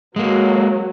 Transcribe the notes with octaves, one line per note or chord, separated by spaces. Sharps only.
F#3 G#3 A#3